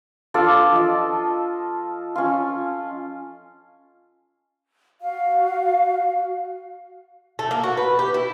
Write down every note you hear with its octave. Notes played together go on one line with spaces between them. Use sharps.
D4 F4 A4 D5
F3 D#5
C#4 F4
F#4 F5
A3
A#3
F#4
B4
G4
E4